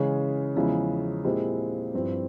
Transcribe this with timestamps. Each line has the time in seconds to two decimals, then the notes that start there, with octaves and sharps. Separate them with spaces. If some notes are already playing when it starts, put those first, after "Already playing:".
Already playing: C#3 E3 G#3 C#4
0.56 E2 C#3 F3 G#3 E4
1.24 A#2 G#3 C4 E4 G4
1.94 G2 F3 C4 E4